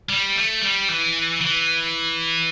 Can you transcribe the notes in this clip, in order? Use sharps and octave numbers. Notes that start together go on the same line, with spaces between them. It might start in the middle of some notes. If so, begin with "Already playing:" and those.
G3
A3
G3
E3
E3